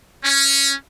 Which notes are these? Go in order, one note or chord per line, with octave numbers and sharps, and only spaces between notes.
C#4